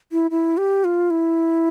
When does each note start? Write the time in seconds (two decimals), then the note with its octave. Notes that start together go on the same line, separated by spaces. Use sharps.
0.12 E4
0.31 E4
0.57 G4
0.84 F4
1.11 E4